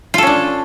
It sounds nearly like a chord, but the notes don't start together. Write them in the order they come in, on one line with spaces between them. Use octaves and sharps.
F4 A4 C#4 D4